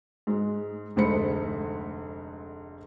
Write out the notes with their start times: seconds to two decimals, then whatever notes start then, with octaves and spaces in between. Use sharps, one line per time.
0.27 G#2 G#3
0.96 F1 D2 G#2 C5 B5 C#7